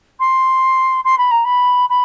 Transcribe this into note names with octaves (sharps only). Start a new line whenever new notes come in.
C6
C6
B5
A#5
B5
B5